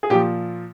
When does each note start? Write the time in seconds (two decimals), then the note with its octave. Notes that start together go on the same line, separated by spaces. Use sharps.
0.03 G#4
0.10 A#2 F3 G4